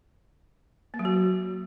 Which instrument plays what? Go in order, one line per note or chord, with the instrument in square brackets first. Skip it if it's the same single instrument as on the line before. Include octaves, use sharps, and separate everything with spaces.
[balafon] A#3
F#3
F#4